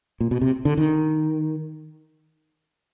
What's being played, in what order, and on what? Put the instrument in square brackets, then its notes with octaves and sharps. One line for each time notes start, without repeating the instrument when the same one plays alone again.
[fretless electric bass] A#2
B2
C3
D3
D#3